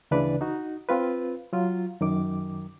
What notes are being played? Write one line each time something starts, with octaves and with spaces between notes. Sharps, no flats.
D2 C#3 E3 D4 B4 D5
D#4 F#4
C4 F4 B4
F#3 F4
F#2 D#3 D6